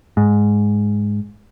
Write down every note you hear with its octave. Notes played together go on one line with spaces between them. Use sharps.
G#2